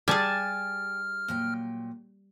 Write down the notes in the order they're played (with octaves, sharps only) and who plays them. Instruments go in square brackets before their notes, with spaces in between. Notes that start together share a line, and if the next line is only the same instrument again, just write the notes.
[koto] G3 G#4 [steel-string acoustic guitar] G4 [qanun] G#5 A5 [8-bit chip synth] F6
[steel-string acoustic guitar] A#2 F#3 G5